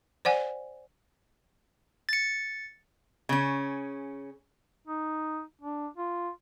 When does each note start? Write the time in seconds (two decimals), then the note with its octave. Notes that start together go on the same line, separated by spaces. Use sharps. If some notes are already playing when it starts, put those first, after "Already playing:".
0.25 C5 D5 F#5 G#5
2.09 A6 C#7
3.29 C#3 C#4
4.87 D#4
5.61 D4
5.97 F4